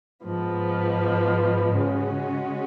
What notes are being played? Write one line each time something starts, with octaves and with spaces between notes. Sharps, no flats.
G#2 F3 B3
C#3 G#3 C#4 F#4